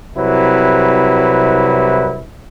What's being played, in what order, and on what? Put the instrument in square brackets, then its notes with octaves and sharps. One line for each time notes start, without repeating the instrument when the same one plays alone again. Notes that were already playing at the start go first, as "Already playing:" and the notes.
[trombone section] C2 C3 F#3 E4 B4